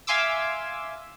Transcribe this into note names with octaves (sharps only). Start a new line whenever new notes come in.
E5 F5 G#5 C6 D6 E6